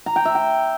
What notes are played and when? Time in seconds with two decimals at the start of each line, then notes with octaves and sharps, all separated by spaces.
0.06 A#5
0.16 G5
0.25 E5
0.35 G5